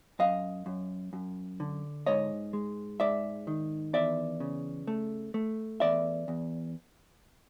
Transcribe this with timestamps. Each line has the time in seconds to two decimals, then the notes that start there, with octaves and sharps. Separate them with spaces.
0.19 F#2 D#5 F5
0.66 F#2
1.13 F#2
1.60 D3
2.06 G#2 C#5 D#5
2.53 G#3
3.00 G#2 D5 E5
3.47 D#3
3.93 E2 D5 E5
4.40 C#3
4.87 A3
5.34 A3
5.80 E2 D5 E5
6.28 E2